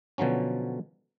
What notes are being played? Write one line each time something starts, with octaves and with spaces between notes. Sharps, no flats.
B2 D3 F3 F#3 C#4